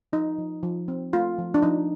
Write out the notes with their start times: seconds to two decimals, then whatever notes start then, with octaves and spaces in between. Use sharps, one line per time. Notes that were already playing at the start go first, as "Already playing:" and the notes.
0.13 F3 D#4
0.39 F3
0.63 F3
0.88 C4
1.13 A3 F4
1.39 F3
1.54 D4
1.62 F3 D#4